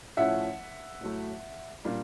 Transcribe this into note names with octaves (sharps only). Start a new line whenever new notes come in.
A2 F3 A3 C#4 E5 F#5
A2 F#3 A3
A#2 G3 A#3 D4